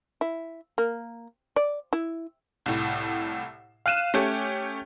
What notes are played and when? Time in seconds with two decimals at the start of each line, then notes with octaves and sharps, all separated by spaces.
0.21 E4
0.78 A#3
1.56 D5
1.93 E4
2.66 C2 A2
3.86 F5 F#6 D#7 E7
4.14 A3 C#4 G4